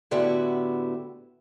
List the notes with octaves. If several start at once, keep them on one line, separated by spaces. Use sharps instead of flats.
A2 D3 B3 E4 F#4 G4